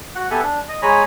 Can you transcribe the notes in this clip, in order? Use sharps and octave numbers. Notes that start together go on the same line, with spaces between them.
F#4 F#5
B3 G4 A4 E5 F#5 G#5
D4
D#5
G#3 C#5 G#5 A#5 B5